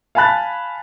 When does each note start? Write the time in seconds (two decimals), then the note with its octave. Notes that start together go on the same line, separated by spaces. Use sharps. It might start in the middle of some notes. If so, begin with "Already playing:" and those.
0.15 F5 G#5 A5 B5 F#6 A6